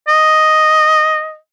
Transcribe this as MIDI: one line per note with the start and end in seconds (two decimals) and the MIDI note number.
0.08 1.36 75